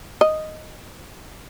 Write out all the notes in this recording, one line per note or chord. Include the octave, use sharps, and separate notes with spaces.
D#5